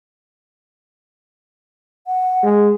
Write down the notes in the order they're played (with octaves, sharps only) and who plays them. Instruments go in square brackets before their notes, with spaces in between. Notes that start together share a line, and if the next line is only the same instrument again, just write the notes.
[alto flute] F#5
[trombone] G#3